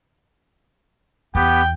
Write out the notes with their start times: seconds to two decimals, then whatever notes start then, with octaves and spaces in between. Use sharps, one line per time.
1.35 E2 B3 G4 G5